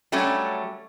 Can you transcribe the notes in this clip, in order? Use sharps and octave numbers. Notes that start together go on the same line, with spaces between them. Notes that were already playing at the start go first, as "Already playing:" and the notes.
F#3 G3 A3 C#4